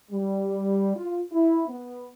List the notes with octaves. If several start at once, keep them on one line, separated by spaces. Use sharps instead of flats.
G3
F4
E4
B3